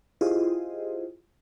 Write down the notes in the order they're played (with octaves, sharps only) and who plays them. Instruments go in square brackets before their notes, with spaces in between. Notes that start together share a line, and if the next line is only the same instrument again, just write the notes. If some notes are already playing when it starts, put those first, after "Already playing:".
[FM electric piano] E4 F4 G4 G#4 C5 D#5